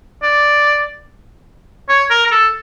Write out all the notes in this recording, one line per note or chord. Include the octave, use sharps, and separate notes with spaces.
D5
C#5
A#4
A#4
A4